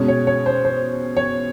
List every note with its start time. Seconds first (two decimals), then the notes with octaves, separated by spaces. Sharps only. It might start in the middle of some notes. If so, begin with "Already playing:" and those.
Already playing: B2 G#3 C#4
0.08 C#5
0.27 C#5
0.46 C5
0.65 C5
1.17 C#5